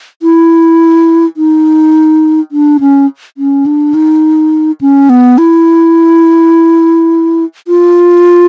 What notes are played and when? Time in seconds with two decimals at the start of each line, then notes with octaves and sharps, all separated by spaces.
0.22 E4
1.37 D#4
2.52 D4
2.80 C#4
3.38 C#4
3.66 D4
3.94 D#4
4.81 C#4
5.09 B3
5.38 E4
7.68 F4